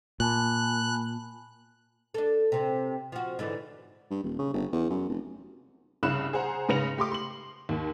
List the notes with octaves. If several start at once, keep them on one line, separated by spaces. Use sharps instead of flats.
A#2 G#5 A5 B5 F#6
D4 A4
C3 C4
F3 F#4
G#2 D3 E3
G2
D#1
C#3
G1
E2
F#2
F1
C2 G2 C#3 B5 F#6 E7
G#4 C5 F#5 A#5
G#2 C#3 B4 A#6 C#7 F7
A3 G4 C6 D6
C6 F#7
D#2 D#3